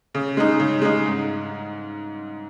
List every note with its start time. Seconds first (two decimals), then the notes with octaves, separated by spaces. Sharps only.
0.15 C#3
0.37 G#3 D#4
0.60 C#3
0.82 G#3 D#4
1.05 G#2